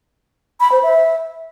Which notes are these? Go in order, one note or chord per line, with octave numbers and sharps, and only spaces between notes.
B5
C5
E5